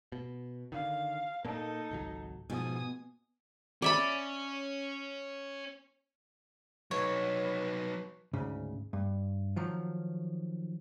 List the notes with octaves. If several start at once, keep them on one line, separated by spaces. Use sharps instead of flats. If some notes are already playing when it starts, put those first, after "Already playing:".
B2
D3 D#3 F5
A#2 A#3 D#4 A4
G#1 C#2 F#3
G#2 B2 F3 G#5 D#6
C#4 D5 E5 B5
F#3 D#4 B4 C#5
D2 G#2 C#3
G2
D#3 F3 F#3